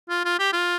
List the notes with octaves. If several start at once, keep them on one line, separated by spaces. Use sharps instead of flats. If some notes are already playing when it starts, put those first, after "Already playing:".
F4
F4
G4
F4